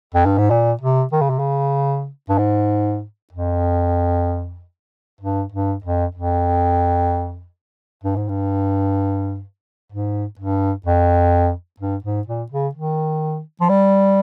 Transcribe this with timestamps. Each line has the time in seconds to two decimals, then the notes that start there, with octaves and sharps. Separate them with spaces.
0.14 F2
0.26 G2
0.38 G#2
0.50 A#2
0.81 C3
1.13 D#3
1.21 C#3
1.30 C3
1.39 C#3
2.29 G2
2.38 G#2
3.33 F2
5.21 G2
5.52 G2
5.84 F2
6.15 F2
8.04 G2
8.16 G#2
8.29 G2
9.92 G#2
10.39 G2
10.86 F2
11.80 G2
12.04 G#2
12.27 A#2
12.52 C#3
12.75 D#3
13.61 F3
13.69 G3